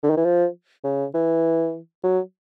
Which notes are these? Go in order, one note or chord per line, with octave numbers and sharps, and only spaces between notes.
D3
D#3
E3
F3
C#3
E3
F#3